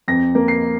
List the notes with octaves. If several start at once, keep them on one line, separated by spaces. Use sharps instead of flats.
F2 A#6
A#3
C7